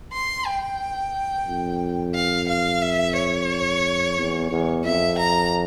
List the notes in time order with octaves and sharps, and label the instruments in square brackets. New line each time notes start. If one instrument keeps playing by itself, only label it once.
[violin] C6
G5
[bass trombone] F2
[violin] F5
F5
E5
C#5
[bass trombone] E2
E2
[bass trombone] F2 [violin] E5
[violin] A#5